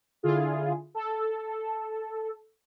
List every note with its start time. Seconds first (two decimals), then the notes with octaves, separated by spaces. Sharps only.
0.23 D3 E4 F4 G#4
0.94 A4